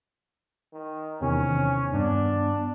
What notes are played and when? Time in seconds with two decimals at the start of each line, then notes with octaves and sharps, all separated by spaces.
0.73 D#3
1.21 E2 C3 D#3 C#4
1.92 G2 B3 D4